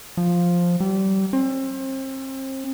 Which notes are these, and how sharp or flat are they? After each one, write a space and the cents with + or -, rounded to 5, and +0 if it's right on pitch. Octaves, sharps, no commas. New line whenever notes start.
F3 +5
G3 -30
C4 +35